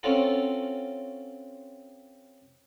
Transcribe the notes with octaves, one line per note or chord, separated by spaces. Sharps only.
C4 C#4 F4 F#4 A4